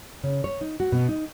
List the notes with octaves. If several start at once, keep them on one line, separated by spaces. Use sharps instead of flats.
C#3
C#5
D#4
F#4
B2
D#4